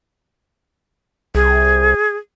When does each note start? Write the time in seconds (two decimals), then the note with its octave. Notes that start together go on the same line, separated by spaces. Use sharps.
1.35 C2 G#4